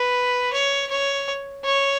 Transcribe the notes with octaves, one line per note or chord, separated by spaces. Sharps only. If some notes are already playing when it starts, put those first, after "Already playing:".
Already playing: B4
C#5
C#5
C#5